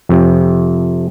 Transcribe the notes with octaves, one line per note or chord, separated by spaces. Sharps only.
F2 C3